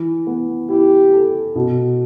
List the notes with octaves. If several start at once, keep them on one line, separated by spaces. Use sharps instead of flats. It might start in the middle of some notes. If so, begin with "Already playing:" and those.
Already playing: E3
B3
E4 G4
A4
B2